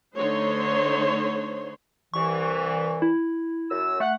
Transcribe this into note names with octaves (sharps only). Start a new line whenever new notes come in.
D3 A3 D#4 C5 C#5 C6
C2 E3 C#6
E4
F#2 E6
A3 F#5